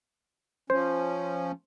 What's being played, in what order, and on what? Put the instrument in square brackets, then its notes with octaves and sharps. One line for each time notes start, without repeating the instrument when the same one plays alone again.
[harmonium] F3 C#4 [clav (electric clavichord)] C5